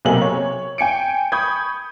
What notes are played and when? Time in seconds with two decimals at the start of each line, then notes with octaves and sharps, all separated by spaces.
0.05 B1 C3 A#3 G#5 F#7
0.21 C#5
0.78 G5 G#5 C#7 D7
1.32 B5 C#6 D#6 G6 G#6